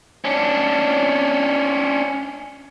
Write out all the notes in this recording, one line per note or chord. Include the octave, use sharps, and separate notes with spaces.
C#4 D4